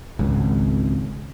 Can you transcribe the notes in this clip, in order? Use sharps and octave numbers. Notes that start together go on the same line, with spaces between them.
G#1 C#2